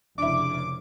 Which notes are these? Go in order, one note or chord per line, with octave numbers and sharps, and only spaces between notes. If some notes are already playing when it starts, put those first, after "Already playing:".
F1 C#3 D4 E4 D6